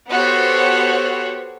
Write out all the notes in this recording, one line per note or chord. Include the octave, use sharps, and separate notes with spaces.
B3 F#4 G4 A4 C5 C#5